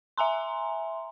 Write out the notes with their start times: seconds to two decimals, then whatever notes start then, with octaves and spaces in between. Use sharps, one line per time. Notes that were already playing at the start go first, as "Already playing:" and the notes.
0.18 E5 G#5 A#5 C6